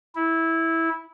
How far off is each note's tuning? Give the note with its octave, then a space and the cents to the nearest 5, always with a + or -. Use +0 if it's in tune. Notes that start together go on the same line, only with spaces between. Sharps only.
E4 -10